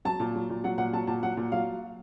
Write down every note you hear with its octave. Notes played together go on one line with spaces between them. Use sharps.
F#3 A5
A#2
F#3
A#2
F#3 F#5
A#2 F#5
F#3 A5
A#2 A5
F#3 F#5
A#2
F#3 F5